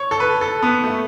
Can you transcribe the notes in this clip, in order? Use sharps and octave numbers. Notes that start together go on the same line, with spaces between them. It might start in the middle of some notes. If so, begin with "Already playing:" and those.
Already playing: C#5
A4
B4
A4
B3
A3